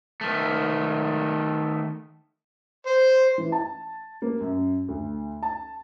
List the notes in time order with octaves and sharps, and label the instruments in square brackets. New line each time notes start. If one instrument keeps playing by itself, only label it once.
[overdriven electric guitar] D#3 A3
[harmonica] C5
[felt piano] E3
A5
A#3
F#2
D2
A5